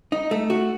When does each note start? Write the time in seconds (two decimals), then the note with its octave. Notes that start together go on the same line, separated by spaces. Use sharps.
0.12 D#4
0.31 A3
0.50 F#4